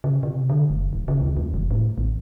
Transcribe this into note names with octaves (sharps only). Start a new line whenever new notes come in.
C#3
C3
D3
F#1
D#1
C#3
D2
D#2
F1
A2
A1